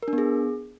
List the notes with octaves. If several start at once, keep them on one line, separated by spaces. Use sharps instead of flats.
A#4
D4
B3
G#4